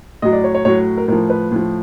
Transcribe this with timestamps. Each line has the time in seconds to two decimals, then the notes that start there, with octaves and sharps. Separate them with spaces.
0.22 A2 F#3 D#5
0.33 D5
0.44 C#5
0.55 C#5
0.65 A2 F#3 C#5
0.97 A#4
1.08 A2 F3 A#4
1.30 B4
1.51 A2 F3